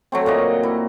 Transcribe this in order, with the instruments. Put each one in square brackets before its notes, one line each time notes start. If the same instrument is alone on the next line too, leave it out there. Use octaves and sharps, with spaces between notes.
[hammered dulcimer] F#3 A3 C4
A#2 A#3 D#5
E4